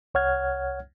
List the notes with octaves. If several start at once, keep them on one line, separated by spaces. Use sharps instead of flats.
C2 C#5 F#5 F6 G#6